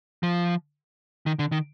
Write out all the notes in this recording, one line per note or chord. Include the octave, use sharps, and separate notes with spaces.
F3
D#3
D3
D#3